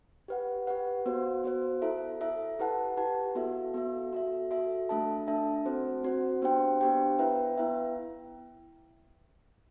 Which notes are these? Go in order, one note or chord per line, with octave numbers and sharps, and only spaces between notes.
G4 B4 F#5
G4 B4 F#5
B3 F#4 C5
B3 F#4 C5
E4 A4 E5
E4 A4 E5
E4 G4 B4 F#5 A5
E4 G4 B4 F#5 A5
B3 F#4 A4 E5
B3 F#4 A4 E5
F#4 A4 E5
F#4 A4 E5
A3 D4 A4 E5 A5
A3 D4 A4 E5 A5
C4 F#4 C5
C4 F#4 C5
B3 D4 G4 C5 G5
B3 D4 G4 C5 G5
B3 E4 B4 E5 G5
B3 E4 B4 E5 G5